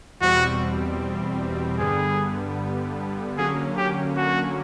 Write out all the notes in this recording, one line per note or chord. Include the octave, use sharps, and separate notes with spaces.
E2 B2 G3 C4 F#4
G2 D3 G3 B3 G#4
D3 F#3 A#3 C#4 G#4
G4
F#4